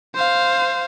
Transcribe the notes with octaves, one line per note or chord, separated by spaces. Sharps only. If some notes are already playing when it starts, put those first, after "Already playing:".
C5 F5